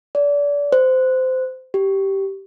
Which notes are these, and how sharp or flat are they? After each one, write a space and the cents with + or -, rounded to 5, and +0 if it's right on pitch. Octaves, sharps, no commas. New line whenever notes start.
D5 -30
C5 -20
G4 -10